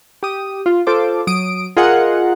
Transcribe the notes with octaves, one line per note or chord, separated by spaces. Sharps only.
G4 D#6
F4
F4 A4 C5 D6
F#3 D#6 D7
F4 G#4 A#4 D#5 F#5